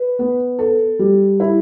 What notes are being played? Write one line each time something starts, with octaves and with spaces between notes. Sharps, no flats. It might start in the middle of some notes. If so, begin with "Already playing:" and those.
Already playing: B4
B3
A4
G3
E4